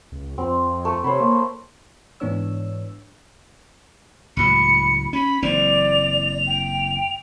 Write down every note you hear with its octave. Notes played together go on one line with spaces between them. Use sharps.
C#2
F2 C4
A3
C3 C5 C#5 B5
A#3
G#2 E3 B3 D4 C#5 E6
C#2 A2 F#3 B5 C#7
C#4 B5
F#1 E3 C4 D5 F7
G5